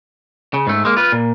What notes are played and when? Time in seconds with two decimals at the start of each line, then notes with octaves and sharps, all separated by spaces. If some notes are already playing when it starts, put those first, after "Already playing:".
0.54 C#3
0.67 G#2 A3
0.85 G#3 A#3
0.97 F4 B4
1.12 A#2